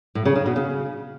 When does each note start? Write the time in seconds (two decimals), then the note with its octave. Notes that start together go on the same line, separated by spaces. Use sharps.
0.15 A2
0.25 C#3
0.36 C#3
0.46 B2
0.56 C#3